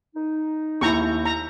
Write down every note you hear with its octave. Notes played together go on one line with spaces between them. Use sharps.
D#4
D#2 E4 A#5 C#6 E6 G6
A#5